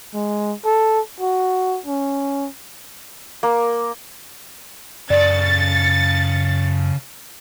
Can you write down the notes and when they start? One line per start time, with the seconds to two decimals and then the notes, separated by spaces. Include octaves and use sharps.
0.14 G#3
0.65 A4
1.20 F#4
1.86 C#4
3.43 A#3
5.10 F#2 C#3 A4 D5 A6 C#7